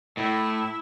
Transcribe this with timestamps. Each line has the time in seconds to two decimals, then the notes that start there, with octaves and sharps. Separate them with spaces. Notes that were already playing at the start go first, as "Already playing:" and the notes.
0.17 A2 E4 E5